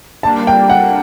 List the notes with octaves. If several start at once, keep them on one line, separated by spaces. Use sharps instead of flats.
G3 A#3 D4 A5
G5
F#5